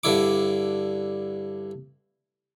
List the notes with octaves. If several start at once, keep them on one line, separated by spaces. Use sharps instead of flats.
G2 D3 E4 D6